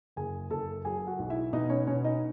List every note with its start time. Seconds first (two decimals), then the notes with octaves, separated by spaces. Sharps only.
0.16 F#1 G#4 G#5
0.50 F#1 A4 A5
0.85 F#3 G#4 G#5
1.07 F#4 F#5
1.19 B1
1.30 E4 E5
1.53 B2 D#4 D#5
1.70 C#4 C#5
1.87 B2 C#4 C#5
2.04 D#4 D#5